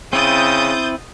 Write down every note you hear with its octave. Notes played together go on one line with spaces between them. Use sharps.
C#3 C4 E4 D#6 G6 A6